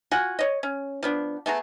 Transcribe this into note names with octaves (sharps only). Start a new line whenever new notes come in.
F4 F#4 F#5 G#5
C#5 D#5
C#4
F3 B3 D4
A3 B3 G#4 A#5